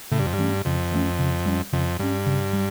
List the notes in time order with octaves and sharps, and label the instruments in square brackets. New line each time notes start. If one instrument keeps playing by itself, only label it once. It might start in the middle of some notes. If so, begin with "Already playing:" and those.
[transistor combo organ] A2 [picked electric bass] C#3
[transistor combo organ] G2
F2
G2
[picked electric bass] E3 A3 C#4
[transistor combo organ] F2 [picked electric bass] C#3
[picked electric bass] E3 A3 C#4
C#3
G3 C#4
[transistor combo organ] F2 [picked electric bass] C#3
[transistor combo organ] G2 [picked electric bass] G3 C#4
[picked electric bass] C#3
G3